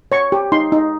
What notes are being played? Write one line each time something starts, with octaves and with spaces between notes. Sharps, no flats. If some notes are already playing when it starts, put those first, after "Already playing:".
C#5 C#6
G4
D#4 C6
D#4